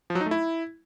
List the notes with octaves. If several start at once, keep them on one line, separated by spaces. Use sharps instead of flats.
F3
F#3
D#4
A3
E4